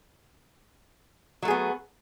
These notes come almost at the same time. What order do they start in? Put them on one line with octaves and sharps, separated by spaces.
F#3 A3 G#4 B3